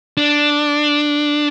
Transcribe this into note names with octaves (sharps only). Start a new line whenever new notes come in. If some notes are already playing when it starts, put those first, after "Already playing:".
D4